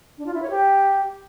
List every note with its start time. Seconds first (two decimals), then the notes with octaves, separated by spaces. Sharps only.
0.18 D4
0.26 F4
0.34 E4
0.42 C#5
0.50 G4